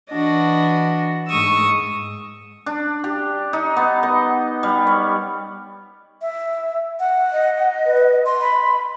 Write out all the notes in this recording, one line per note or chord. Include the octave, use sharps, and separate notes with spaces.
E3 D4 F#4 D#5
G#2 G#3 C#6 D#6 E6
D4
G4
D#4
B3
D#5
G3
C#5
E5
F#5
D#5
B4
C6
B5